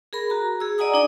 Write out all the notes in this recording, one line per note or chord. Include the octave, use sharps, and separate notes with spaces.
G#4 A#4 B5
F#4 A#5
G#4 E6
D5 D#5 F#5 G#5 A#5 D#6
D4 D#4 D5 D#5